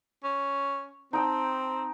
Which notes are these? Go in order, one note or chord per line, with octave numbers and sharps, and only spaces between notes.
C#4
C4 D#4 G5 A5